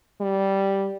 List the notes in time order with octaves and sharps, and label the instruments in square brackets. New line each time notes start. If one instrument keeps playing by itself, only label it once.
[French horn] G3